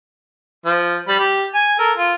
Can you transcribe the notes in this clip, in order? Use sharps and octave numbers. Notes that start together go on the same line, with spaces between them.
F3
G3 B5
G4
G#5
A4 A#4
F4